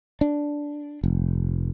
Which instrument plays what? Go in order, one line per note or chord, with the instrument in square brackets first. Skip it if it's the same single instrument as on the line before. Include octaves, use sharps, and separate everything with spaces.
[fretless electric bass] D4
F1